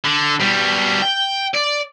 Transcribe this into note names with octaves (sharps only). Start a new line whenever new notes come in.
D3
B2 G3
G5
D5